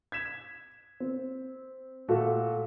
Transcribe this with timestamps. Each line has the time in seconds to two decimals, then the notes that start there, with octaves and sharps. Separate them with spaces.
0.12 G#6 B6 E7
1.00 C4
2.08 A#2 A3 F#4 A4